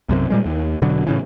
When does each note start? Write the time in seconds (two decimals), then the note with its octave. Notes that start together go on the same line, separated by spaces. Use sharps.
0.09 B1 F#2 C3
0.30 A#2 G3 G#3
0.45 D#2
0.82 E1 B2 D3 F#3
1.07 A2 C#3 E3